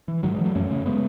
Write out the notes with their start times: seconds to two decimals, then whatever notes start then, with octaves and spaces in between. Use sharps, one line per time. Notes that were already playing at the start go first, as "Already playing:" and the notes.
0.08 E3
0.23 G#2 D#3 F#3
0.34 E3 G#3
0.44 F#3 A3
0.55 F#2 A3 C#4
0.71 C#3
0.86 G#3 B3